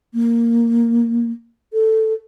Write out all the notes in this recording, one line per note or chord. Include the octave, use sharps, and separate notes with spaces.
A#3
A4